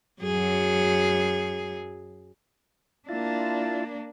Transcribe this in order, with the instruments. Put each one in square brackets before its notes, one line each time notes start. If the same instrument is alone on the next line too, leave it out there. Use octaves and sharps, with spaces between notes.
[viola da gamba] F#2 F#3 G#4
[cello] A#3 D4 [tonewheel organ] E4 F4 A5